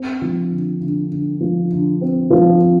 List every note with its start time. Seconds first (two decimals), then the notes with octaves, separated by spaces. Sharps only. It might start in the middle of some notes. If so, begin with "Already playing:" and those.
Already playing: C4
0.21 F3
0.50 D3
0.81 D3
1.11 D3
1.40 F3
1.71 D3
2.01 C4
2.30 F3
2.61 C4